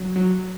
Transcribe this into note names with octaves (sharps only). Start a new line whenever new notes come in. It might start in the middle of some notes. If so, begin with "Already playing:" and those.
Already playing: F#3
F#3